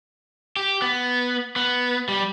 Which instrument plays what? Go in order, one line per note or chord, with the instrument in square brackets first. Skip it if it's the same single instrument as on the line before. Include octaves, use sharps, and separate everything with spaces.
[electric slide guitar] G4
B3
B3
G3